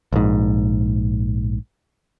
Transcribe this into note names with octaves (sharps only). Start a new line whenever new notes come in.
A#1 G#2